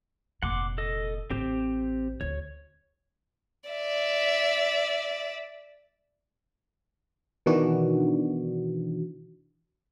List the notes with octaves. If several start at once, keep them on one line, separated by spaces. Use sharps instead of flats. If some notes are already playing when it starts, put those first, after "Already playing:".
F1 A#2 F#5 C6 D6
A4 D#5
A1 C4 G4 C5
D2 C#5
D5 E5
B2 D#3 E3 D4 F#4